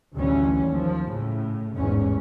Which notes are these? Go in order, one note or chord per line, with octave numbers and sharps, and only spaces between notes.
A1 D2 E3 G3 C#4
D#2 F3
A2 C#3
A1 E2 G#2 C#4